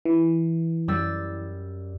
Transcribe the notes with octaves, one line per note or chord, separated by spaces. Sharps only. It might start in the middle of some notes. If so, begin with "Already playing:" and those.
E3
F#2 G3 E6 A6